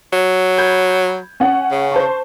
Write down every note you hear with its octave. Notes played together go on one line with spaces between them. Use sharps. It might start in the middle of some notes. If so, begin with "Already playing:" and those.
F#3
B5 G6 G#6
C#4 F#5
C#3
C5 A5 C#6